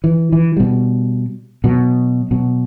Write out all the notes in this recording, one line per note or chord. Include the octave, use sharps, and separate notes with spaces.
E3
E3
B2 G3
B2 F#3
B2 F#3